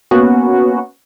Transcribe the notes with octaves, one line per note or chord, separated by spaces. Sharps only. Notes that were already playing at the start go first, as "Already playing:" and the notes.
A#3 B3 C#4 F#4